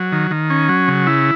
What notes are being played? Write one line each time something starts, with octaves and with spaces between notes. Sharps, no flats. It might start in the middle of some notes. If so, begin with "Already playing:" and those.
Already playing: F#3
D#3
D#3
C#4
F#3
C#3
E4